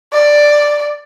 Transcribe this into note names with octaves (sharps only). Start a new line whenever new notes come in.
D5